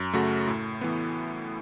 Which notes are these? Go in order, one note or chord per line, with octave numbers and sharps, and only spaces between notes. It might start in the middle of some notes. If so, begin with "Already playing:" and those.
Already playing: F#2
C#3 A3 F#4
A2
E3 B3